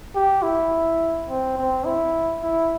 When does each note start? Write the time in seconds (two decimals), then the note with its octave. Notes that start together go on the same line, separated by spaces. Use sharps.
0.15 G4
0.43 E4
1.29 C4
1.58 C4
1.85 E4
2.43 E4